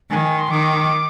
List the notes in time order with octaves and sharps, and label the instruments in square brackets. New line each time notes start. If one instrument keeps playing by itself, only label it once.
[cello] D#3 [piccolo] G#5
[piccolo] G#5
C6
[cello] D#3 [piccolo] D6